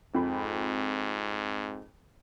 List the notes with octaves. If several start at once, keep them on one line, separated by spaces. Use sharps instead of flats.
F2 G#2 B5